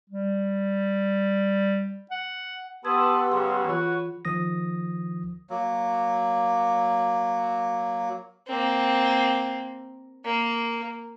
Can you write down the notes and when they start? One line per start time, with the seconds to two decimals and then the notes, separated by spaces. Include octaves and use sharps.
0.10 G3
2.11 F#5
2.85 B3 G4 B4 A5 C6 D#6 E6 G#6
3.32 C#3 F#3 G#4 F#5
3.65 E3 F4 F#4 B4 C#5
4.25 D#3 F3 D#6 A#6
5.50 F#3 A#3
8.48 A#3 C4
10.25 A#3